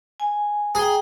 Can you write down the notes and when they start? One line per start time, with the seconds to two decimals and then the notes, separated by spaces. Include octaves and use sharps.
0.20 G#5
0.75 G#4 G5 A#5